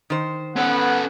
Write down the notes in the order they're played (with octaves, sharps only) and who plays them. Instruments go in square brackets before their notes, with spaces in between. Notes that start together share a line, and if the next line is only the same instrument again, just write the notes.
[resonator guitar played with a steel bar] D#3 C5
[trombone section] B3 [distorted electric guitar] C#4 A4 [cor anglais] F#5